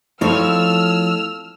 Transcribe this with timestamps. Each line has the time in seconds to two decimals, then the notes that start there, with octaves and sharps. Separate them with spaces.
0.21 F3 A3 C4 D#4 E4 C#5 E6 F6